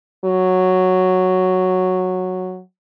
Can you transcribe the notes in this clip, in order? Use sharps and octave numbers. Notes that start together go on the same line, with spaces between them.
F#3